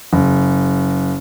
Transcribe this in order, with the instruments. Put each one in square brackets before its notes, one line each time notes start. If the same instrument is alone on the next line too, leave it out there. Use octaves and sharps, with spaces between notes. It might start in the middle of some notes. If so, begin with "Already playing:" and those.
[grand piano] F#1